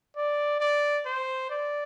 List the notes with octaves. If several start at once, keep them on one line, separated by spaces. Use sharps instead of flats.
D5
D5
C5
D5